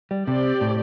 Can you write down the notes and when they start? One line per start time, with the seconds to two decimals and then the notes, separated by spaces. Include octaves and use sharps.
0.11 G3
0.27 C3 C4 G4 D5
0.61 A2